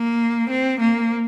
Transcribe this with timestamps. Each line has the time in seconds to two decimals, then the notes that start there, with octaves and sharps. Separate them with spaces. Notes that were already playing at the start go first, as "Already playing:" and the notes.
Already playing: A#3
0.50 C4
0.80 A#3